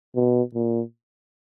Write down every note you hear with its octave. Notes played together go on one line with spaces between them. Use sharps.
B2
A#2